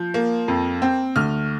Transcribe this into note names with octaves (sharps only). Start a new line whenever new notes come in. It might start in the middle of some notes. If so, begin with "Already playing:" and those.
Already playing: F3 G6
A#3
F2
C4
D2 F6